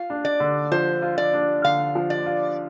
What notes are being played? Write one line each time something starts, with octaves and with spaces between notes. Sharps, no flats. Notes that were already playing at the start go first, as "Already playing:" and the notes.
Already playing: F4 F5
D4
D5
D3
F3 C5
F4
D5
D4
D3 F5
F3
D5
F4